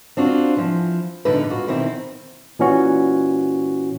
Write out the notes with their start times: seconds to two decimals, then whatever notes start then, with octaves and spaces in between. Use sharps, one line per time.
0.17 C4 D4 F4 F#4
0.57 E3 F3
1.25 E2 A#2 D3 D#4 A4 B4
1.50 F4 F#4
1.67 B2 D#3 E3 C4 E4
2.59 A#2 E3 C#4 F#4